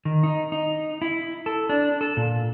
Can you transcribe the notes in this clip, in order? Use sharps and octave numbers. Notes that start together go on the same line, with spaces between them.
D#3
D#4
D#4
E4
A4
D4
A4
A#2